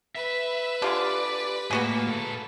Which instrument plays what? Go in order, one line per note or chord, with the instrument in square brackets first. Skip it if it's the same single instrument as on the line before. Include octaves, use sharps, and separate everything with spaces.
[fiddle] B4 B5 [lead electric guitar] E5
[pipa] D3 F4 G#4 [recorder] G4 [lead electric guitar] D5
[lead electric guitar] A2 [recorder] A#3 [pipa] B3 F#4 G#4
[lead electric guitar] A#2 A4